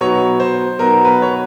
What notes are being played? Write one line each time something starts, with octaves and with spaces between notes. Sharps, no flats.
B2 F#3 B3 D#4 C#5
C5
B2 F#3 B3 D#4 A#4
B4
C#5